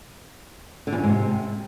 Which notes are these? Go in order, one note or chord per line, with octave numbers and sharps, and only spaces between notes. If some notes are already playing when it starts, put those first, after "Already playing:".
D3
E2
F#2
G#2
C3